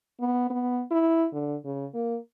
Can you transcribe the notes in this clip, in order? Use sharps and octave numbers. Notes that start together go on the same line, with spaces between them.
B3
B3
E4
D3
C#3
A#3